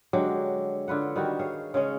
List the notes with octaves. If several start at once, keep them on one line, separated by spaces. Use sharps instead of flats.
D3 F#3 G#3 G4
D3 F4 B4 F#5
D#3 G3 D#4 F#4
G#4 C#5 F5
C#3 G#3 C#4